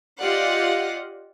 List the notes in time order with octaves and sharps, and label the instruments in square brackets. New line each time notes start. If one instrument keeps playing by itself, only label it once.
[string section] F4 G4 D5 D#5 F5 F#5